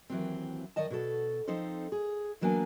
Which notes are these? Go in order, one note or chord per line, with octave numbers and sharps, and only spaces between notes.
D#2 E3 F#3 C4
D#3 D5 D#5 A5
B2 F#4 A4
F3 C4 D#4 A4 C5
G#4
E3 F#3 A#3 B3 D4 G#5